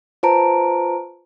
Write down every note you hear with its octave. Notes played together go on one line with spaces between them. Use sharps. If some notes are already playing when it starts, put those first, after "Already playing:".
F4 B4 C5 A5 A#5 D7